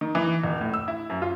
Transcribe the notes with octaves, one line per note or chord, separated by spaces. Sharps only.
D#3
E3
D#1
A2
E6
E4
F#2
F4